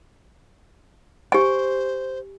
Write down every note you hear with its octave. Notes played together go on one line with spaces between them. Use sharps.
G4 C5 G#5